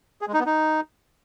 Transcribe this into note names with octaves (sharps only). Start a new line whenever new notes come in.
G#4
G#3
D#4
B3
D#4